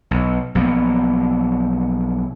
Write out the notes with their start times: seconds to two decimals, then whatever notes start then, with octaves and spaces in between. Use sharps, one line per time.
0.11 B1
0.55 B1 F3 A#3 B3